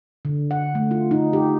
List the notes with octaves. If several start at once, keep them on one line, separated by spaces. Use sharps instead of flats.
D3
F#5
A3
F4
D#4
G4